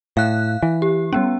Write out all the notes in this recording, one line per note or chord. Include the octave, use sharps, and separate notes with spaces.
A2 F5 F#6
E3
G4
G3 B3 C#4